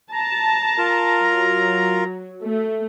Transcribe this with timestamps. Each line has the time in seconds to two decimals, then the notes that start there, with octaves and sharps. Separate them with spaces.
0.13 A5 A#5
0.78 F4 A#4
1.22 F#3
2.43 A3